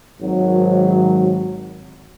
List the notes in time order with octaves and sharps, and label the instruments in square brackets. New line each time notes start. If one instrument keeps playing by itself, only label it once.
[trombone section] G#1 F#3